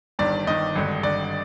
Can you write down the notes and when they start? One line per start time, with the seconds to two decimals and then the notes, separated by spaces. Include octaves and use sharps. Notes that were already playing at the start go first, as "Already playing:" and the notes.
0.19 G1 G2 D#3 D5
0.47 G1 G2 D#3 D#5
0.75 G#1 G2 D3
1.03 G#1 G2 D3 D5